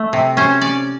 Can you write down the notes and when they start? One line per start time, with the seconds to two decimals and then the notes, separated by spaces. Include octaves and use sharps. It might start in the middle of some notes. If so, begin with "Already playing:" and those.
Already playing: A3
0.13 C3
0.37 C#4 C5
0.61 C#4 D5